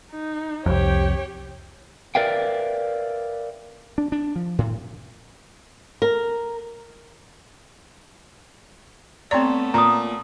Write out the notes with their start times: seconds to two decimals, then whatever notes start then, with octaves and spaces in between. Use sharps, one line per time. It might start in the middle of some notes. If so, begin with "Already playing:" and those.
0.11 D#4
0.66 C2 F2 G4 C#5 G5
2.15 A#4 B4 D5 E5 F5 G5
3.98 D4
4.12 D4
4.36 F3
4.58 A2
6.02 A#4
9.31 A3 B3 C4 C#5 D5 A#5 C6
9.74 A#2 A#5 D#6